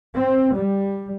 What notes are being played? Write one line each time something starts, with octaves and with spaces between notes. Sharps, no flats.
C4
G3